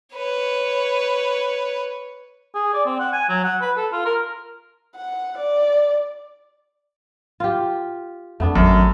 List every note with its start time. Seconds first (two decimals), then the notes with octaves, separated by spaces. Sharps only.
0.15 B4 C#5
2.54 G#4
2.73 D5
2.86 C4
3.00 F#5
3.13 G#5
3.29 F#3
3.44 F#5
3.61 B4
3.77 A4
3.92 F4
4.05 A#4
4.96 F#5
5.38 D5
7.40 F4 G4
8.40 F2 A3 B3 D4
8.56 G#1 F#2